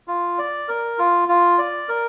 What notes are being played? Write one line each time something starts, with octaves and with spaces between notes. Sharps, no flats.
F4
D5
A#4
F4
F4
D5
A#4